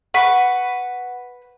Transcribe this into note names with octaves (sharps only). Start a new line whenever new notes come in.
B4 F#5 B5 C#6